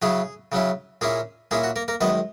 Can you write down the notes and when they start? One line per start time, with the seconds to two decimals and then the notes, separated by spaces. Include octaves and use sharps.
0.02 C#3 F#3 C#4 E4 G#4
0.52 C#3 F#3 C#4 E4
1.01 A#2 A#3 C#4 E4 G#4
1.51 A#2 A#3 C#4 E4 G#4
1.64 F#4
1.76 A#3 A#4
1.88 A#3 A#4
2.01 F#2 D#3 G#3 B3 B4